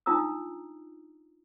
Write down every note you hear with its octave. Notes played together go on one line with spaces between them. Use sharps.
D4 D#4 F4 A#5 D#6 E6